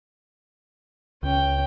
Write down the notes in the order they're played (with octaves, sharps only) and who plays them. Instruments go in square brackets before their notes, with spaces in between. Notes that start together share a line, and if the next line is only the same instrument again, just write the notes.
[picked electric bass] C#2 [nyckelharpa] C#4 G5